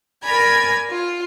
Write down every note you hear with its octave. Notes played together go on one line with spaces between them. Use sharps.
A#4 D5 G#5 B5 G#6
F4